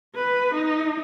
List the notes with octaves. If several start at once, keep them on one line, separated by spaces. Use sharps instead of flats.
B4
D#4